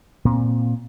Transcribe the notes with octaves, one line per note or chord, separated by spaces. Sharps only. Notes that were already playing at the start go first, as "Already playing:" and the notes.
A#2 C4